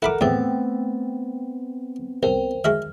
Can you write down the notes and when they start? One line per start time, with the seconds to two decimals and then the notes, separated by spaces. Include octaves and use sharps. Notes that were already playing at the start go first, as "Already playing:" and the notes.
0.02 E4 A4 A#4 F#5 B5 D6
0.21 E2 A2 A3 B3 C4 G5
2.23 C2 A#4 C5 G5
2.64 G#3 F#4 E5 F6